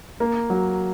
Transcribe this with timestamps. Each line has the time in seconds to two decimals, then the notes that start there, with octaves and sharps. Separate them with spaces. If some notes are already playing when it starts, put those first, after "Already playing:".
0.20 A#3
0.50 F#3